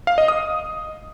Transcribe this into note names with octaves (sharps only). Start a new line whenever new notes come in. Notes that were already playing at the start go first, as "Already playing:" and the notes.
F5
D#5
D#6